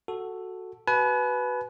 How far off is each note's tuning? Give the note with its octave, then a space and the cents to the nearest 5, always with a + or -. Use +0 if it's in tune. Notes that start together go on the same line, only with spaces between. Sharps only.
F#4 +0 A4 +0
F#4 +25 B4 +0 G#5 +45